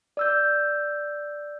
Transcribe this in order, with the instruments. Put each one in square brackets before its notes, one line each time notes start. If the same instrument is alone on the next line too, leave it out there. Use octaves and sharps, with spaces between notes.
[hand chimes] D5 E6 G6